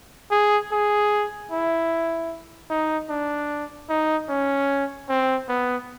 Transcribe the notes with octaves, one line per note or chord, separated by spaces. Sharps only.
G#4
G#4
E4
D#4
D4
D#4
C#4
C4
B3